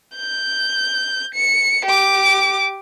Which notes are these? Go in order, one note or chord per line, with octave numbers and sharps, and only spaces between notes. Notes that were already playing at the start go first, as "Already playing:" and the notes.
G6
C#7
G4 D6